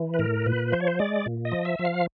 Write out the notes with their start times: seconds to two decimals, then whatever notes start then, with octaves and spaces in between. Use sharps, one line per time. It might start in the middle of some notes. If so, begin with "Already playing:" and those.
Already playing: E3
0.14 B4
0.19 A2 A#4
0.46 A#2 B4
0.72 F3 C5
0.80 C#5
0.87 C5
0.99 G#3 D5
1.26 A#2
1.45 D#5
1.52 F3
1.65 E5
1.79 F3
1.85 F5